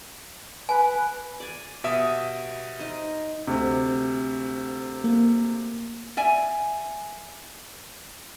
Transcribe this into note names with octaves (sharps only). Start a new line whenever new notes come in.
B4 G#5
D5 G#5
B2 G4 E5 D#6
D#4 C5
D2 C3
A#3
D5 E5 G#5